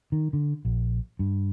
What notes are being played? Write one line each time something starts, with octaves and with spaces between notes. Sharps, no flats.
D#3
D3
A#1
G2